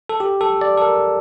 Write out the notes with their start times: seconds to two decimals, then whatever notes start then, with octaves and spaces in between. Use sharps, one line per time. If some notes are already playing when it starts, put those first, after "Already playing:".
0.09 A4
0.20 G4
0.41 A4
0.61 D5
0.77 A4
0.82 A#4